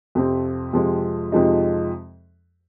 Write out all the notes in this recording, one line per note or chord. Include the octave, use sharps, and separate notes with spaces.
F2 C3 F3 C4
F2 C3 F3 G#3
F2 C3 F3 G#3 D#4